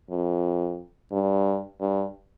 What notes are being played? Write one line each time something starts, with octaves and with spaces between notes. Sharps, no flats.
F2
G2
G2